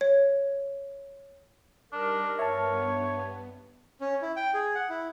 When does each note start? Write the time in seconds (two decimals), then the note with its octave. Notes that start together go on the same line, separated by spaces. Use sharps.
0.01 C#5
1.92 G3 D4 D#4 A#4
2.39 G2 B3 C#5 E5 A5
4.01 C#4
4.22 E4
4.36 G5
4.54 G#4
4.75 F#5
4.90 E4